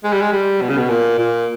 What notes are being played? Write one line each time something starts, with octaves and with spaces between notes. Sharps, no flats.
G#3
G3
G#3
G3
B2
C#3
B2
A#2
A#2